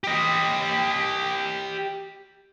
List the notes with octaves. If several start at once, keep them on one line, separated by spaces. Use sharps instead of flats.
G4 D#5